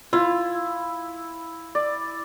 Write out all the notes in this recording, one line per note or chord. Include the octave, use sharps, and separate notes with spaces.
E4 F4
D5